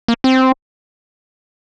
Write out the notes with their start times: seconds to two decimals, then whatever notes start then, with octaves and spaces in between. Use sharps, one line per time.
0.08 A#3
0.24 C4